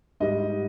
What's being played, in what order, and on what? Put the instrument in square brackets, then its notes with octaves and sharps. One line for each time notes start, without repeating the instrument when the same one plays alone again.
[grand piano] G#2 G3 D#5